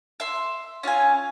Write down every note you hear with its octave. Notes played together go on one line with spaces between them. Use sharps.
E5 C6
C#4 F4 F5 G#5